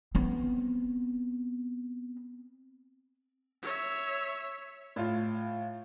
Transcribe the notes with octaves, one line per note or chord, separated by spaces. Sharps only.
B3 C4
C#5 E5
A2 F4